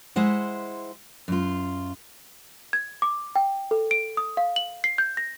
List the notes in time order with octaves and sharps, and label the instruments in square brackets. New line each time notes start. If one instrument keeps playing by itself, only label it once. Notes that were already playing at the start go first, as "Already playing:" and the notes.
[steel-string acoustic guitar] G#3 E4 C5 F#5
F#2 F4
[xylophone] G#6
D6
G5
A4
D7
D#6
F5
F#7
C7
G6
A#6